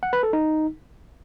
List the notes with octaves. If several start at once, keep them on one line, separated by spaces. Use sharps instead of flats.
F#5
B4
A4
D#4